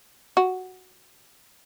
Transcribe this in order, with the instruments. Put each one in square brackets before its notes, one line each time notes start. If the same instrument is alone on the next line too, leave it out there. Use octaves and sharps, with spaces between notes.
[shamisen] F#4